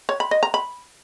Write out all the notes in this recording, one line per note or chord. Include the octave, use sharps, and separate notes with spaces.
C#5
B5
D#5
A#5
B5